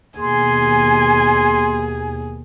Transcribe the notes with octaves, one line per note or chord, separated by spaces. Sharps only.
D#2 B2 G#4 G#5 C6